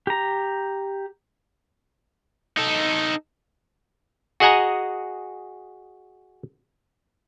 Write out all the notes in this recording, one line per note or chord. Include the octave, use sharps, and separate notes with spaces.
G4 A#5
D#4 A4
F#4 G#4 D#5 F#5 G#5 A#5